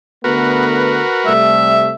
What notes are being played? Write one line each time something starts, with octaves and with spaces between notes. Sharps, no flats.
D3 A3 B3 F#4 A#4 B4
C3 G3 A3 E5